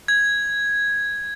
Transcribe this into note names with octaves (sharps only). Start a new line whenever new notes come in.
G#6